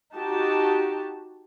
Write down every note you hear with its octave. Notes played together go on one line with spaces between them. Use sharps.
D#4 F#4 G4 A5